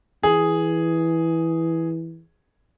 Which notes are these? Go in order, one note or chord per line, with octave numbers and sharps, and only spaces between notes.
E3 G#4